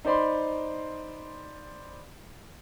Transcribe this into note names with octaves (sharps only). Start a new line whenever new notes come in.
D#4 C5 D5 B5 C6